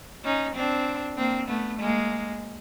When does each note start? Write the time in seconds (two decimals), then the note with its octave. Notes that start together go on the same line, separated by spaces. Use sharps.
0.24 C#4 D#4
0.55 C4 D4
1.18 A#3 C4
1.48 A3 B3
1.80 G#3 A#3